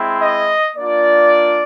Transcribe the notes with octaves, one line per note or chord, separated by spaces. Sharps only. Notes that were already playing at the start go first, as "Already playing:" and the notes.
Already playing: G#3 C4 E4
D#5
A#3 D4 F4 D5